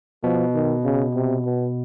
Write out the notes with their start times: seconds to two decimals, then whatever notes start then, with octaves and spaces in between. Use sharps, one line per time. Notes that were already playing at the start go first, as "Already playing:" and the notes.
0.23 B2 F3
0.54 D#3
0.84 C#3
1.15 C3
1.45 B2